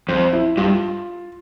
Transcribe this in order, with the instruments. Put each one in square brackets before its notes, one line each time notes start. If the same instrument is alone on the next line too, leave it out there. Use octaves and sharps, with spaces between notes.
[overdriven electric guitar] F2 [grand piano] C5
[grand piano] E4
[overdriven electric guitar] G2 [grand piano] F4